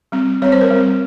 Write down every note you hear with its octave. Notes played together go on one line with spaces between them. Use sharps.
G3 C4
G3 C4 C#5
C5
A#4
G3
C4